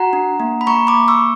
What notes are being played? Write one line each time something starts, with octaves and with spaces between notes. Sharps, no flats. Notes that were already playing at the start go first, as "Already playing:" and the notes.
Already playing: F#4 F#5 A#5
D4
A#3
B5
A#3 A#5 C#6
B5 D6
A#3
C#6 E6